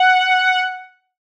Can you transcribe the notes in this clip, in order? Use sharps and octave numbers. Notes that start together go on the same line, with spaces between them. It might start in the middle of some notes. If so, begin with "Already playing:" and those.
Already playing: F#5